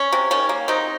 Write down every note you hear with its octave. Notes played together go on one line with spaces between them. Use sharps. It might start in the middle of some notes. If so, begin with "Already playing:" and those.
Already playing: C#4
C3
D#3 C#4
A#3
C3 C4 D#4